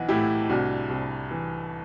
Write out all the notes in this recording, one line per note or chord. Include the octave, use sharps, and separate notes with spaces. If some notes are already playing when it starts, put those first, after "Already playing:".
Already playing: B1 E3 F#5
A2 E4 G4
C2 D4 F#4
C2
E3